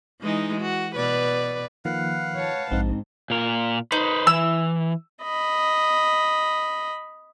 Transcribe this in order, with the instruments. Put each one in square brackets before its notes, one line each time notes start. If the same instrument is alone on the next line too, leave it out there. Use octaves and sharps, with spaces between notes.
[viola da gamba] E3 G#3 D#4
F#4
B2 B4 D5
[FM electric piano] D#3 F3 A#3 [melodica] B4 F5 F#5
[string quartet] C#5 A5
[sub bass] A#1 [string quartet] G#2 [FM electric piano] C4 D#4
[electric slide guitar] A#2 A#4
[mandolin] D#4 [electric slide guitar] B4 C5
[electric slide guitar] E3 [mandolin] E6
[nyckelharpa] D#5 B5